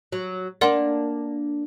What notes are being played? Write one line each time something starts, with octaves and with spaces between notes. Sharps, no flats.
F#3
A#3 D4 D5 F#5 C6